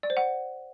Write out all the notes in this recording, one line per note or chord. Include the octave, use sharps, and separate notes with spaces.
D5
C5
F#5